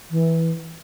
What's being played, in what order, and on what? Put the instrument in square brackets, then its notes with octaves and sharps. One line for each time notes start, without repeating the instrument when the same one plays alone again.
[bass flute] E3